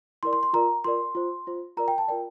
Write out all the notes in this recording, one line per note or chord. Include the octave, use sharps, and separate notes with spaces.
E4 A#4 D5 C6
C6
C6
F4 A#4 D5 A#5
F4 A#4 D5 C6
F4 C5
F4 C5
F4 A#4 D5 A#5
G5
A5
F4 A#4 D5 G5